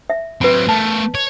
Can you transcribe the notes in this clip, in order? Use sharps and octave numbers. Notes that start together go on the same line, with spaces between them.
E5
F#3 C4 B4 B5
A3 A#4 A5
C#5